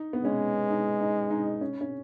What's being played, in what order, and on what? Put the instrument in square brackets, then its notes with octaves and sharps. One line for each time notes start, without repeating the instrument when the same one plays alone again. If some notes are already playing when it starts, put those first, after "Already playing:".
Already playing: [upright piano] D#4
B3
[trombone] G#3 [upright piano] C#4
[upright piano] D#4
D#4
D#4
C#4
C#4